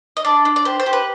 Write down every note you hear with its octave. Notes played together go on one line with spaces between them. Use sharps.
D#5
D4 D5
D4
D5
G4 C5
C5
G4
B4